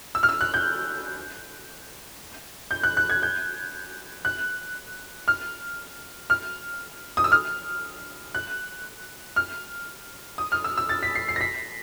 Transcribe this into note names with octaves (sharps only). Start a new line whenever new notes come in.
E6
F6
E6
F#6
G6
G6
F#6
F#6
G#6
G6
F#6
F6
F6
D#6
E6
F6
F#6
F6
D#6
F6
E6
E6
A6
B6
C7
C7
A#6
B6